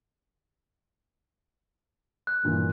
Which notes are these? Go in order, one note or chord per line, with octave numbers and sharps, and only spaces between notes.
F#6
G2 A#2 E3